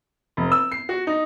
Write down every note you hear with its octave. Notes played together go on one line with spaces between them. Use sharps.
F1
E6
C7
F#4
D#4